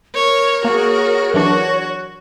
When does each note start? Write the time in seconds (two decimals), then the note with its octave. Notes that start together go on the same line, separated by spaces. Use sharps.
0.15 A#4 C#5
0.65 A#3 F#4 G#4 C#5
1.34 E3 F#3 D4 F#4